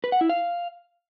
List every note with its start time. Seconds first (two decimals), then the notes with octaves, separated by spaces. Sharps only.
0.04 B4
0.12 F#5
0.21 E4
0.29 F5